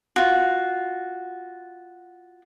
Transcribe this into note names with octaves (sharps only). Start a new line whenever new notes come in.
F4 F#4